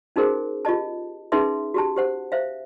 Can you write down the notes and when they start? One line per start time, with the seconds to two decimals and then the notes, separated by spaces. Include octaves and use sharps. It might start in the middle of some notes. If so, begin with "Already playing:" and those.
0.16 C#4 D#4 F#4 G#4 A#4 C5
0.65 F4 G4 D#5 A5
1.32 C#4 D#4 G#4 B4 E5 C6
1.74 F#4 G4 A5
1.96 G4 C5 F#5
2.32 C5 E5 F5